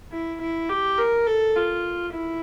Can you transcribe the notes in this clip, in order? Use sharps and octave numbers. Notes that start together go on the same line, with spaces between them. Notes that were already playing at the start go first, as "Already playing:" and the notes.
E4
E4
G4
A#4
A4
F4
E4